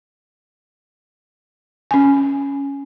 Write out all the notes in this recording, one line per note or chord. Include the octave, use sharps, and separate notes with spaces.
C#4 G#5